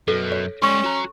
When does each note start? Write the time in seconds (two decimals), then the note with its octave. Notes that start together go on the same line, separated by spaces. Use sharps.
0.08 F#2 B2 A4
0.32 C#5
0.62 G3 G#3 C#4 C6 C#6
0.84 F#4 A#5